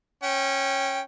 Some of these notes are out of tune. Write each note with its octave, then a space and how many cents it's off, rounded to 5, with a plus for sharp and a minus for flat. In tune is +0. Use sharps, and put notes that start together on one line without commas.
C#4 -15 G5 +0